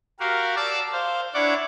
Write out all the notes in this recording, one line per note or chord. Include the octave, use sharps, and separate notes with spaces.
F#4 G4 A#4 F5
D5 F5 A5 D6 E6
C5 F5
D4 E4 C#5 D5 F#5 D6